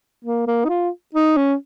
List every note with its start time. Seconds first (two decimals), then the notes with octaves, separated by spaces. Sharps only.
0.25 A#3
0.47 A#3
0.65 D#4
0.69 F4
1.15 D#4
1.37 C#4